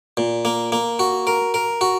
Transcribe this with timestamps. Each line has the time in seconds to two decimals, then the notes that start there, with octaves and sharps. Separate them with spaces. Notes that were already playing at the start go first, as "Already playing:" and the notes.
0.17 A#2
0.45 A#3
0.72 A#3
0.99 F#4
1.27 A#4
1.54 A#4
1.81 F#4